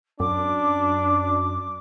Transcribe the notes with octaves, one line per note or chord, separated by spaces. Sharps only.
F#2 D4 D6